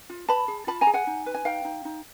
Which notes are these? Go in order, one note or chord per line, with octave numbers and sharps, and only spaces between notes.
F4
B4 A5 B5
G#4
F4 A5 B5
G#5 A#5
G#4
F#5 G#5
D#4
B4
G#5
D#4 F5 G5
D#4
D#4